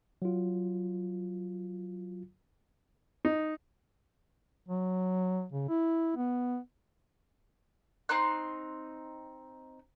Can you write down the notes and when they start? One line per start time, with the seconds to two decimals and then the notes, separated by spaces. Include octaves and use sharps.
0.22 F#3 F4
3.25 D#4
4.68 F#3
5.53 C#3
5.69 E4
6.17 B3
8.09 C4 D#4 C6 F#6